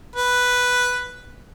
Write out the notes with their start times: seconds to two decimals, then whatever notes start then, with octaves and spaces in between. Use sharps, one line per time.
0.16 B4